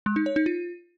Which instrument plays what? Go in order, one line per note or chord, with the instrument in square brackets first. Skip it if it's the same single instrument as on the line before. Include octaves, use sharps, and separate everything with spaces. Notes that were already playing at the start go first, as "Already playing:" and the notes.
[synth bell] G#3
D#4
C#5
D#4
F4